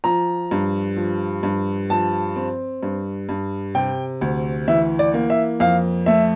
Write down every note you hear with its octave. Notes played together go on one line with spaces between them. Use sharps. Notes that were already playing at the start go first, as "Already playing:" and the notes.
F3 A#5
G2
F3
G2
F3 A5
C4
G2
G2
C3 G5
D2
E3 E5
D5
A#3
E5
F2 F5
A3 E5